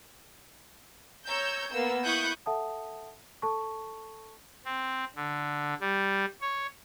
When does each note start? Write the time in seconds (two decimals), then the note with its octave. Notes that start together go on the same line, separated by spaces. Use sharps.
1.26 C#5 A#5 E6 G6
1.71 A#3 B3 E6
2.04 E4 C#6 D#6 F#6 G6
2.46 A4 E5 F#5 A5 D#6
3.42 A4 A5 C#6
4.65 C4
5.15 D3
5.81 G3
6.41 C#5